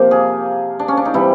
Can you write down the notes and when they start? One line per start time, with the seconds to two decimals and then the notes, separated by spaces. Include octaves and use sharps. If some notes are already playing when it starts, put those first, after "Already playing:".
Already playing: C3 F3 A#3
0.11 G#4
0.79 D4
0.88 C#4
0.97 D4
1.05 D#4
1.14 C3 E3 G3 E4